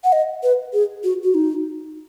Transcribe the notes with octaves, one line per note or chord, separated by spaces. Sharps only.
F#5
D#5
B4
G#4
F#4
F#4
D#4